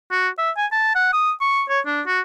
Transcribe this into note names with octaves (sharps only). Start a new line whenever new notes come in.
F#4
E5
G#5
A5
F#5
D#6
C#6
C#5
D4
F#4